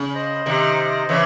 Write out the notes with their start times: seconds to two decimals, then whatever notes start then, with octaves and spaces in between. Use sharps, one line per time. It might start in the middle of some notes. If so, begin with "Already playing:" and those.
Already playing: C#3
0.15 C5 D#5
0.46 C3 D#3
1.09 C#3 E3 C#5 E5